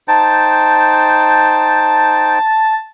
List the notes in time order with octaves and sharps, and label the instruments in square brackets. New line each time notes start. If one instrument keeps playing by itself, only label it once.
[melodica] D#4 C5 G5 [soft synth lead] A5